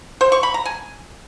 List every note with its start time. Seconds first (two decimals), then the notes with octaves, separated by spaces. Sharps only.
0.21 C5
0.32 C#6
0.43 B5
0.54 A#5
0.65 G#5